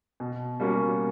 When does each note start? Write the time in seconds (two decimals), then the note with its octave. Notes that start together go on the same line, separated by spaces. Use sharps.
0.20 B2
0.60 G3 A#3 C#4 F#4